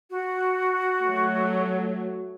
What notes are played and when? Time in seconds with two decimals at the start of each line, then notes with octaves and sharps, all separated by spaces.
0.10 F#4
1.06 F#3 A3